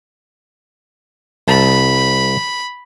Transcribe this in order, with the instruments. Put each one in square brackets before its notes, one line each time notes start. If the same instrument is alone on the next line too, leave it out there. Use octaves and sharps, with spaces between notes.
[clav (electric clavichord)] C2 A5 [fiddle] B5